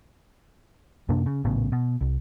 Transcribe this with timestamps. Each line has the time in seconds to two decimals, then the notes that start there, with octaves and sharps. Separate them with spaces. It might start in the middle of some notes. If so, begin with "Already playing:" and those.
1.09 F#2 C3 A#3 D4
1.26 C#3
1.45 A#1 A2 C#3 B3
1.72 B2
2.01 C2